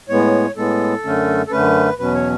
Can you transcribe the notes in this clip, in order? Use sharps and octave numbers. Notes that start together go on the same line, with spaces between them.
A2 G#3 B3 C#5
A2 G#3 B3 A4
F#2 D3 A3 C#4
A4
F#2 D3 A3 C#4 B4
E2 B2 F#3 C#4 B4
C#5